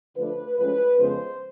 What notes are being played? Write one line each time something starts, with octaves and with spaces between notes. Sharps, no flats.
D3 F3 A3 D4 B4
A2 F3 G#3 C#4 B4
F2 C#3 F3 G#3 B3 C5